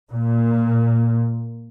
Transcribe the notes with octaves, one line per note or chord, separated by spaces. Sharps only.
A#2